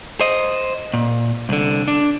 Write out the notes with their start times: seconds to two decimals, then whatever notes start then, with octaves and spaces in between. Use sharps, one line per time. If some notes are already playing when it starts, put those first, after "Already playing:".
0.21 C5 D#5
0.94 A#2
1.49 C2 D3
1.88 D4